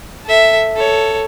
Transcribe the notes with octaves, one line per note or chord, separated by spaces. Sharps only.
A4 E5
A4 C#5